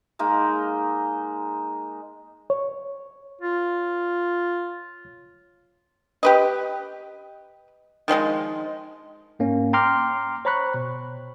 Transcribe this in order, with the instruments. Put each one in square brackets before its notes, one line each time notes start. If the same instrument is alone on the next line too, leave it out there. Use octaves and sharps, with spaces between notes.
[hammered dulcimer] G#3 A#3 D#4
[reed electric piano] C#5
[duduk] F4
[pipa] G4 B4 D#5
D#3 F3 G3 G#3
[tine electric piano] G#2 A#3 C#4
G5 A#5 C6 D6 F6
C5 C#5 A#5 B5 C#6 F#6
B2